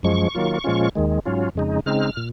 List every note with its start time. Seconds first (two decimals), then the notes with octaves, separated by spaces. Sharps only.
0.03 F#2 F3 G#3 C#6
0.35 D#3 F#3 A#3 F4
0.64 A#2 F3 G#3 C#4 F4
0.95 D#2 D#3 G#3
1.25 G#2 F#3 C#4 F4
1.55 F2 C#3 G#3 D#4
1.86 C#3 G#3 C4 D#4 F6
2.17 A#2